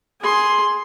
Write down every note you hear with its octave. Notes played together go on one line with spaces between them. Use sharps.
G#4 C6